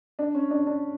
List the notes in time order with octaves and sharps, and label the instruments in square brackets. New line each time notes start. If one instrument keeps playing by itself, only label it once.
[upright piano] D4
C#4
D4
D4